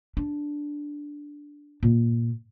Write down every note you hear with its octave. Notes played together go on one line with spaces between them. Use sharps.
D4
A#2